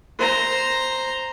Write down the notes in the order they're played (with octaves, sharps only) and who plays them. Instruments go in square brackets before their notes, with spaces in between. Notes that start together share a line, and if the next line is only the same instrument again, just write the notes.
[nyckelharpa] C5 A#5